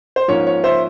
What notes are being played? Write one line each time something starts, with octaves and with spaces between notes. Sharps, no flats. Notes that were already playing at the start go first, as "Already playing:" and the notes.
C5
G#2 F3 A#3 C#4 C#5
C#5
C5 E5